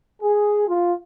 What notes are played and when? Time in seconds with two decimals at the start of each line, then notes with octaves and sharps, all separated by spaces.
0.22 G#4
0.68 F4